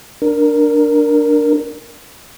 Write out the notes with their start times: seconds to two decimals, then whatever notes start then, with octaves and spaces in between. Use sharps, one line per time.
0.22 D4 A#4